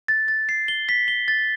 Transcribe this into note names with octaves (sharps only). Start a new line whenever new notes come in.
A6
A6
C7
G7
B6
G7
A6